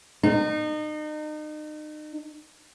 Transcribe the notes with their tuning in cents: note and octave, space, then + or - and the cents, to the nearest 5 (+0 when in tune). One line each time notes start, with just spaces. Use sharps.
D#4 -35